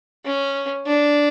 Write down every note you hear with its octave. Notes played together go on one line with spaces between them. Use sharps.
C#4
D4